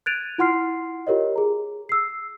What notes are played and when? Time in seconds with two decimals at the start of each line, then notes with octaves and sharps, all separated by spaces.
0.06 F#6 G#6 A6 D7 D#7 F7
0.38 E4 F4 F#5 C6 F6 C7
1.07 F4 G4 A#4 C#5 D#5
1.36 G#4 A#5
1.89 E6 C7